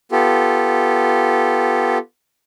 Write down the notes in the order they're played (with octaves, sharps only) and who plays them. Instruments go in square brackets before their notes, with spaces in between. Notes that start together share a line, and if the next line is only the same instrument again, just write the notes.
[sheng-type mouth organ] B3 F4 G4 A4